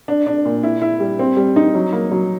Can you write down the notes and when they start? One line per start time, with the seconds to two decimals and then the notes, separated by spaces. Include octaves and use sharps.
0.08 D4
0.26 D4
0.45 A#2
0.63 E4
0.82 E4
1.00 G3
1.19 C4
1.37 G3
1.56 D#4
1.75 F#3
1.93 A#3
2.11 F#3